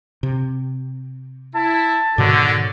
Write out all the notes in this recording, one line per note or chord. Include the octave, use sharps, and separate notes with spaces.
C3
E4 A5
G#2 B2 D3 D#3 F#4 C#5 D5